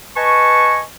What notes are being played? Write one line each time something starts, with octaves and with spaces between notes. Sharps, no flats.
B4 D#5 G#5 A5 C#6